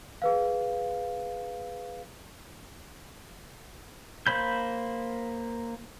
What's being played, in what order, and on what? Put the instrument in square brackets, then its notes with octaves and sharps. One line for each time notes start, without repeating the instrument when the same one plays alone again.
[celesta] G#4 B4 F5
[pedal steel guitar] A#3 C5 B5 G6